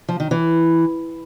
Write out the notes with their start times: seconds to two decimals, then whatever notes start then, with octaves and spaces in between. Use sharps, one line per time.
0.09 F3
0.20 D#3
0.31 E3